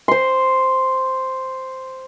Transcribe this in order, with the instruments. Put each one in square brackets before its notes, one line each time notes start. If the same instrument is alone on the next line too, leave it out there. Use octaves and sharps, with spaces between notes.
[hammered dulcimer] C5 C6